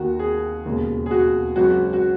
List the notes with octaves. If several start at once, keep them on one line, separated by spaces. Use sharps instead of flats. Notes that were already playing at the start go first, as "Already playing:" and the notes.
Already playing: D#2 D#3 F#4
G#4
E1 D#2 C#3
G#4
F#4
G#1 F#2 C#3 F#4
F#4